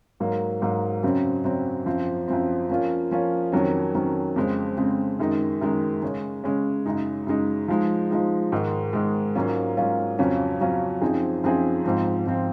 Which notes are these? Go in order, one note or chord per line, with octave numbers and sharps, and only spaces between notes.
G#2 F#3 A#3
G#2 F#3 A#3
F#2 C#3 F#3 C4
F#2 C#3 F#3 C4
F#2 F3 C4
F#2 F3 C4
F3 A#3 C#4 F4
F3 A#3 C#4 F4
F2 D#3 F#3 C#4
F2 D#3 F#3 C#4
F2 C#3 G#3 C4
F2 C#3 G#3 C4
F#2 D#3 G#3 D#4
F#2 D#3 G#3 D#4
C#3 G#3 C#4
C#3 G#3 C#4
F#2 C#3 G#3 D#4
F#2 C#3 G#3 D#4
F3 G#3 D#4
F3 G#3 D#4
G#2 D#3 G#3
G#2 D#3 G#3
G#2 F#3 A#3 C#4 F4
G#2 F#3 A#3 C#4 F4
F2 C#3 F#3 C#4 F4
F2 C#3 F#3 C#4 F4
F#2 F3 C4 D#4 G#4
F#2 F3 C4 D#4 G#4
G#2 F3 C4
G#2 F3 C4